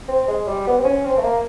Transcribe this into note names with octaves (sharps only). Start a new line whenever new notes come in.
C4
G#3
G3
B3
C4
C#4
C4
A3
A#3